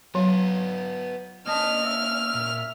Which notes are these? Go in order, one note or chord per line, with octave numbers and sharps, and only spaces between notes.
F#3 B3 F4
A#3 D#5 A5 F6
E5
A#2